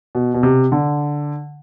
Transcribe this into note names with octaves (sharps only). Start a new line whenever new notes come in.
B2
B2
C3
D3